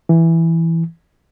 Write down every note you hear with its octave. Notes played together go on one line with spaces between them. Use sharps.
E3